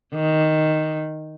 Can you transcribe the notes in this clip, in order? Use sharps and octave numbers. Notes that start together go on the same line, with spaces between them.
D#3